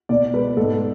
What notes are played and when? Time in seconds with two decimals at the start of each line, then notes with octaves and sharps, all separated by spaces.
0.09 B2 D5
0.33 G#3 B4
0.57 G#2 A4